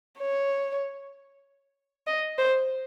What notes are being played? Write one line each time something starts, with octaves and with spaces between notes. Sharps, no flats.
C#5
D#5
C5